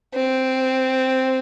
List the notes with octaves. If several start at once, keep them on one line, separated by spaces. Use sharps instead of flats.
C4